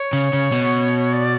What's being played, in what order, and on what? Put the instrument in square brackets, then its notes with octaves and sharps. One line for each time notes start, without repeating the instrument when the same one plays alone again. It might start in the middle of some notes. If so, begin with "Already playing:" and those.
Already playing: [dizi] C#5
[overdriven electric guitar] C#3
C#3
B2
[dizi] D5